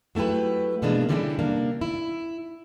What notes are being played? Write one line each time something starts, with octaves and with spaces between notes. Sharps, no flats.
F#3 A3 E4 G4 B4
B2 E3 F3 G#3 A#3 D4
D3 E3 G3 C#4 D4 E4
C3 A#3 D4
E4